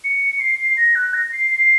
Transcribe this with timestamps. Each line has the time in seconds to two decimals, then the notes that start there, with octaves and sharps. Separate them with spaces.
0.04 C#7
0.40 C7
0.77 A#6
0.95 F#6
1.14 A#6
1.32 C7
1.51 C7